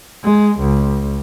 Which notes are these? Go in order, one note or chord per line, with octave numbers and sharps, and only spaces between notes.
G#3
C#2